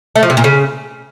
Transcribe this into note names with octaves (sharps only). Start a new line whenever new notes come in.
A3
F3
C3
A#2
C#3